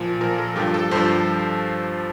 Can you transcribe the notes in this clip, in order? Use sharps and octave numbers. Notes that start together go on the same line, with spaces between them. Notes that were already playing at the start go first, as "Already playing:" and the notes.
Already playing: A#2 F3
A#2 F3 A#4
A4
G2 F3 G4
A4
G2 F3 C5